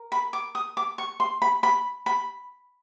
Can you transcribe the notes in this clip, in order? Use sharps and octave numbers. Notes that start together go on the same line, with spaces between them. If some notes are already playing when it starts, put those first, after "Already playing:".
Already playing: A#4
B5
D6
D#6
D6
C#6
C6
B5
B5
B5